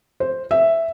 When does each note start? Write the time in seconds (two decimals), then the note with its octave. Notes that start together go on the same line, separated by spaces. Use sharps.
0.20 C5
0.51 E5